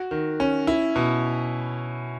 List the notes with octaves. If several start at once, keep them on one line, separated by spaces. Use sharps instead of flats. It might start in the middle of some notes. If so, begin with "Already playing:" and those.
Already playing: F#4
D#3
C#4
E4
B2